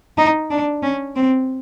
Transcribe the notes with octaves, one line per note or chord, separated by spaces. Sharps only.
D#4
D4
C#4
C4